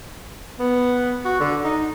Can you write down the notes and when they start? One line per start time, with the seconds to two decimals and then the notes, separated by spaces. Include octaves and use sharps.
0.60 B3
1.25 F#4
1.40 D3
1.64 D#4